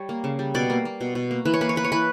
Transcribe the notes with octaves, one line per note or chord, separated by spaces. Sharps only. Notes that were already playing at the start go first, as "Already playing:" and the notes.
Already playing: G3 C#5
A#3
C#3
G3
B2 D5
A#3
A#3
B2
B2
A#3
E3 B4
C#5
A#3 B4
C#5
A#3 B4
C#5
E3 B4